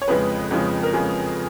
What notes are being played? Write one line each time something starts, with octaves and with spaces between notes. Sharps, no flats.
C#5
F2 C#3 F3 G#3 B4
F2 C#3 F3 G#3
A#4
F2 C#3 F3 G#3 G#4